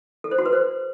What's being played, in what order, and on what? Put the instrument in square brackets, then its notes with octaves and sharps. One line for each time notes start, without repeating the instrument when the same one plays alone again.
[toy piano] A4
C5
F#4
B4
C5